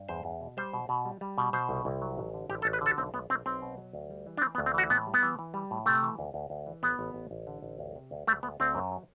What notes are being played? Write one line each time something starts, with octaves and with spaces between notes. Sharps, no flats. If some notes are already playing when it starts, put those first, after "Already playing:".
Already playing: G2
E2 C5
E2
B2
G3 C5
B2
B2
G3
G3
B2
B2 C5
C2
C2
F#3
A1
D3
A1 G4
A4
A1
B4
D3 A4
B1 C4
B1 B3
B1 C4
B1 C4
B2
F#3
D2
G3
E3
D4
E3 C4
B3
D2
C4
E3 F#4
A2 B3
G3
B3
E3
E3
G3
A2
C3 A3
E3
D2
D2
D2
E3
A1 B3
A1
A1
A1
D3
A1
D2
C3
D2
D2 A3
D2 B3
D2 C4
F#2
F#3